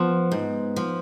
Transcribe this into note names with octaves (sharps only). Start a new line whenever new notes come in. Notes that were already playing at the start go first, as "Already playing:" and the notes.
Already playing: F3 B3
G#2
F3